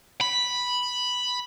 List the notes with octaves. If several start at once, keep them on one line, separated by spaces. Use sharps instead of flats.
B5